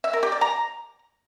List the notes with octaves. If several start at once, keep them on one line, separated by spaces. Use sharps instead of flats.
E5
A#4
G4
D5
A#5